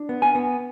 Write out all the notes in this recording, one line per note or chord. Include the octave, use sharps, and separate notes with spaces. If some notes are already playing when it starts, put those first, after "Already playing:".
Already playing: D4
B3
G#5
B3